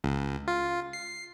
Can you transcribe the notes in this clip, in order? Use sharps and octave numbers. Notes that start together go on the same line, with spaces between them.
C#2
F4
C7